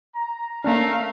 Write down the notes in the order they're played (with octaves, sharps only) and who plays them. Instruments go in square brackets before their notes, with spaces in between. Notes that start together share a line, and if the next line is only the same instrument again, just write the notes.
[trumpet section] A#5
[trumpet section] A3 A#5 [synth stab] A#3 C#4 D4 [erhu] F5